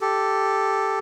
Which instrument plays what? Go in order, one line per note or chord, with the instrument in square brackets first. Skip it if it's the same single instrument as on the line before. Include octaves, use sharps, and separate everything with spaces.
[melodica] G4 A4